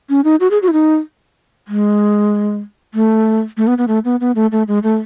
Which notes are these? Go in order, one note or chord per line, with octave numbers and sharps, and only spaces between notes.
C#4
D#4
F#4
G#4
F#4
E4
D#4
G#3
A3
A3
B3
B3
A3
B3
B3
A3
A3
G#3
A3